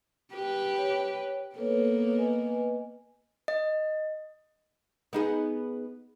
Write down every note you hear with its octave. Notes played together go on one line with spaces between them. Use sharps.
G4 B4
C#5
A#3 B3 A4 B4 C#5
B4 D#5 G#5
D#5
B3 D#4 G#4